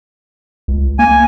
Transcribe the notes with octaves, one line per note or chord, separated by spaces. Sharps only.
C#2
A#3 G#5